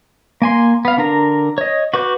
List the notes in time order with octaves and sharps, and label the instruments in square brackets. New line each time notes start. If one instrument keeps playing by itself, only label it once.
[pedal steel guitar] A#3 G#5 C6
B3 F5
D3 D4 A#4 A#5
C#5 D#5
F#4 B4 D6 G6